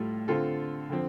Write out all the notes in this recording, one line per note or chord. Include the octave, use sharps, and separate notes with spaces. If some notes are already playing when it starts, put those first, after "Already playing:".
Already playing: A2 G3 F4 A4
D3 A3 C4 F4 A4
D3 F3 C4